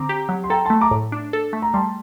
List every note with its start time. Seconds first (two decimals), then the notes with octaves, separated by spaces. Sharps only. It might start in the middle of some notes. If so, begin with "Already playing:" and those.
Already playing: D3 C4 A#5 D6
0.09 G4
0.29 F#3
0.44 C6
0.50 A4 G5 A#5
0.65 A3 A5 C6
0.81 A#5 D6
0.91 A2
1.12 D4
1.33 A4
1.53 A3
1.62 A#5
1.74 G3 A5 C6